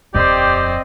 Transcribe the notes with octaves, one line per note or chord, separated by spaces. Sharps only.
D#1 F2 C4 G4 C5 D5 D#5